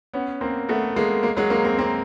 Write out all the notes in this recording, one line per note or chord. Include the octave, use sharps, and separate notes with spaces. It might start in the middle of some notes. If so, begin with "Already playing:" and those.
B3 C#4
A#3 C4
A3 B3
G#3 A#3
G#3 A#3
F#3 G#3
G#3 A#3
A#3 C4
A#3 C4